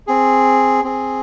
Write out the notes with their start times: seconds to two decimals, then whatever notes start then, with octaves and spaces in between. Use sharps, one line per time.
0.07 C4 G#4
0.84 C4 G#4